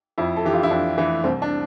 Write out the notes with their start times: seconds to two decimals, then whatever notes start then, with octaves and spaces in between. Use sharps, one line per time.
0.18 F2 E4
0.36 A4
0.45 E3 G4
0.53 F4
0.63 E4
0.71 F2 D4
0.98 E3
1.24 C2 C4
1.42 D4